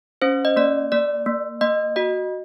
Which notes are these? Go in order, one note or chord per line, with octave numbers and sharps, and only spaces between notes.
C#4 C5
D#5
A#3 D5
A#3 D5
A#3
A#3 D#5
F#4 D#5